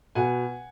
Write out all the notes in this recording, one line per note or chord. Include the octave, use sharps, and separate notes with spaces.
B2 F#5 G#5